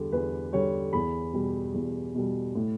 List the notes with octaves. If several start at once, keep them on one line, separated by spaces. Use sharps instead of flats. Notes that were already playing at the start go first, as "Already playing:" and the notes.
Already playing: E2 D3 G3
E2 B4
D3 G3 C#5
E2 B5
B2 G3
E2
B2 G3
A2